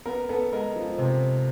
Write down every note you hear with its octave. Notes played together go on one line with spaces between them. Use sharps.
B3 A#4
B3 A4
G#3 A#4
F3
C3